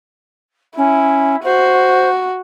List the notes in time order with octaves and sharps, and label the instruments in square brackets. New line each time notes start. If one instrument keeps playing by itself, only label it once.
[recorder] C#4 [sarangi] E4
[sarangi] F#4 [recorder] C5